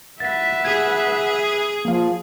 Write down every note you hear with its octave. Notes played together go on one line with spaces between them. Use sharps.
B4 E5 F#5 A6 B6
G#4 G#6
F3 A#3 F5